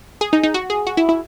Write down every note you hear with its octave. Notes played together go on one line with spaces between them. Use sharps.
G#4
D#4
D#4
F#4
G#4
F#4
E4
E4